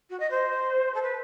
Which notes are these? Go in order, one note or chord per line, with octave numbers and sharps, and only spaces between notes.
F#4
D#5
C5
A4
B4